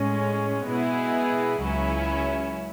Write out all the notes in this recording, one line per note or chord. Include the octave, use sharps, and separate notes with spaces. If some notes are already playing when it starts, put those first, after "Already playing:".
Already playing: A2 G#3 C#4
B2 G#3 B3 E4 G#4
C#2 C#3 F#3 C#4 E4